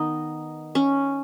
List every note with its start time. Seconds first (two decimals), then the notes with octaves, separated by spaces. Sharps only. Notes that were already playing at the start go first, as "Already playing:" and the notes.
Already playing: D#3 B3 D#4
0.75 C#4